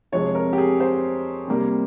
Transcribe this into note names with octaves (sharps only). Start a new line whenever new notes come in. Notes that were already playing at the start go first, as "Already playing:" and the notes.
F2 C3 F3 G#3 C#5
A#4
G4
G#4
C5
C3 G3 A#3